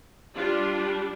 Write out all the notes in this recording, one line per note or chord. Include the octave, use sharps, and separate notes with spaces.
G3 D4 F4